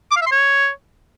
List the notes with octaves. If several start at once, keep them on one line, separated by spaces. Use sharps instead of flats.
D6
F5
E5
C6
C#5